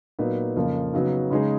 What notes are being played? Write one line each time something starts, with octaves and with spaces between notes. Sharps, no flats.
A#2 F#3 B3 D#4
F2 C#3 F3 A#3
C#3 F#3 B3 D#4
C#3 G#3 D#4 G#4